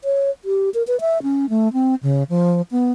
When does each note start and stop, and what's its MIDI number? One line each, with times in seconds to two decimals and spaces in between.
0.04 0.30 73
0.45 0.70 67
0.74 0.83 70
0.87 0.99 71
1.01 1.21 76
1.23 1.49 61
1.49 1.72 57
1.73 1.95 60
2.03 2.24 49
2.30 2.62 53
2.71 2.92 59